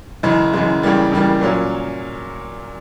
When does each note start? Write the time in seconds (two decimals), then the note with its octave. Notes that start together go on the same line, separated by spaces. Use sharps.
0.23 F#2 C#3 E3 G#3
0.53 F#2 C#3 E3 G#3
0.83 C#2 C#3 E3 G3 A#3
1.12 C#2 C#3 E3 G3 A#3
1.41 A#2 F#3 A#3 C#4 F4